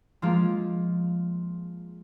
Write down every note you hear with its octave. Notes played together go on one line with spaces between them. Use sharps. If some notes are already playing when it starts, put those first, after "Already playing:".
F3 G#3 A#3 F4